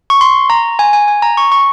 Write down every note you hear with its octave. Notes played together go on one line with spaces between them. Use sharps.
C#6
C6
A#5
G#5
G#5
G#5
A#5
C#6
C#6